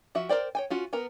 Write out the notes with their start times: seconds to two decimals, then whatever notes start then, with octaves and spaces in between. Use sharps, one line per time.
0.15 F3 F#4 E5
0.29 A#4 C5 D5 G5
0.55 C#5 G5 G#5
0.70 C#4 F4 F#4
0.93 B3 A#4 A#5